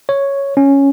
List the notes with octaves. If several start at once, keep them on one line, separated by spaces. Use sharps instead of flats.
C#5
C#4